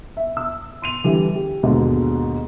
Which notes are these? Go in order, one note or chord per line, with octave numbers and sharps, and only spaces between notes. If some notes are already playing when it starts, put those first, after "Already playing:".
E5
E6
C6 D#7 F7
D3 E3 G3
G4
D#2 G#2 B2 D3